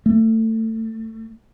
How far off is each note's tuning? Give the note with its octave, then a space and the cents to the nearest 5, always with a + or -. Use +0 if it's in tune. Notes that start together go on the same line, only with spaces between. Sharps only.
A3 +25